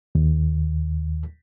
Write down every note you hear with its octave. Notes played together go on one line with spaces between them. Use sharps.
D#2